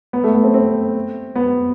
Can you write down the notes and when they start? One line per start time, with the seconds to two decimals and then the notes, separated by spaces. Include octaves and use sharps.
0.13 B3
0.24 A3
0.34 B3
0.44 C4
0.54 C4
1.36 B3